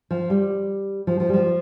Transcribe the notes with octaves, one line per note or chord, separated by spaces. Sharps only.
F3
G3
F3
F3
G3
F3